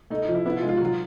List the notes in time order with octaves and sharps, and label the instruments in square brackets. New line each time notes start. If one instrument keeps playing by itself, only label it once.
[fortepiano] A3 [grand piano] D#4
[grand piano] D#4
[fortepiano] F3
[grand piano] E4
[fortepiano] B3 [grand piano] E4
[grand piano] F4
[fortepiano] G#3
[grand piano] F4
F#4
[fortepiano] F#3 [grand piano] F4